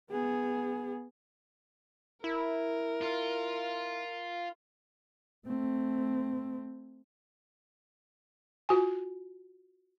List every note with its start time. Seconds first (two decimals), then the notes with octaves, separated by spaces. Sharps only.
0.11 B3 G#4
2.24 E4 A#4
3.02 F4
5.47 A3 C4
8.69 F4 F#4 G#5